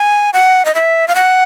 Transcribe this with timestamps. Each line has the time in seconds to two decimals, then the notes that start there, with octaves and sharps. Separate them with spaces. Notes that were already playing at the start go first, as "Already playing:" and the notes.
Already playing: G#5
0.34 F#5
0.65 D#5
0.75 E5
1.08 F5
1.15 F#5